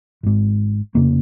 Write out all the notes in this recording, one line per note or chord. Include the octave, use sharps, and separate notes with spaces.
G#1 G#2
F1 F2 C#3 A#3